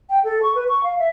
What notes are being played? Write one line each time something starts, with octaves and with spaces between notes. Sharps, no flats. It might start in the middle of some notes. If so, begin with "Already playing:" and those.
G5
A4
C#6
B4
C#6
F5
E5